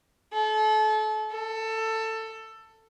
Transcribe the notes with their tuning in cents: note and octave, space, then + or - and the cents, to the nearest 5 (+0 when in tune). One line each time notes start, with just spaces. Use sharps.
A4 -35
A4 +15